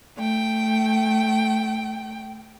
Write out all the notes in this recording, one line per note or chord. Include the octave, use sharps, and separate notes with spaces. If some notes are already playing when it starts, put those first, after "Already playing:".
A3 G5